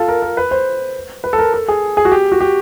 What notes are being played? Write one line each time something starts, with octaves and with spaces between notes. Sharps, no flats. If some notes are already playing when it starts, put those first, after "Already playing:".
Already playing: F4 A4
A#4
A#4
B4
C5
B4
A4
A#4
A4
G#4
G#4
F#4
G4
F#4
G4